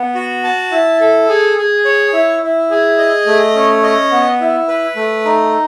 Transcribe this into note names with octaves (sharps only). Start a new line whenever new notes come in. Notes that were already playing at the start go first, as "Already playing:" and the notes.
Already playing: B3
F#4
A5
E4
A4
G#4
G#4
C#5
E4
E4
G#4
D#5
A3
C#4
D#5
B3
E4
B4
A3
D#4